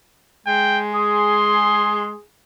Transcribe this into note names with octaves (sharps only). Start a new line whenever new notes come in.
G#3 G5
G#4 C6